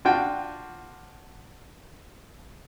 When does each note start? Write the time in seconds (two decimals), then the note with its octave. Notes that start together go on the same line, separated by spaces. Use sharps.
0.05 D4 F4 F#4 G5